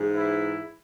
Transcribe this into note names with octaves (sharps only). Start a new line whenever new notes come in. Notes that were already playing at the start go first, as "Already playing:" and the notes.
Already playing: G#2 E3
E4